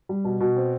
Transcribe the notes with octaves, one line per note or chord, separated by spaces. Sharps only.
G3
B2
B2
C4